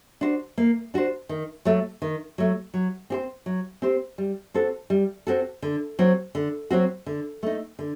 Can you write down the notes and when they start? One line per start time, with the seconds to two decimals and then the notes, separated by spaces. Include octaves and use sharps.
0.21 D4 F#4 C5
0.58 A#3
0.94 D4 F#4 C5
1.29 D#3
1.65 F#3 A3
2.02 D#3
2.38 F#3 A3
2.74 F#3
3.10 C4 G4 C5
3.46 F#3
3.82 C4 G4 C5
4.18 G3
4.54 C4 F#4 A4
4.90 G3
5.27 C4 F#4 A4
5.62 D3
5.99 F#3 C4 F#4
6.35 D3
6.70 F#3 C4 F#4
7.06 D3
7.43 A3 D#4
7.79 D3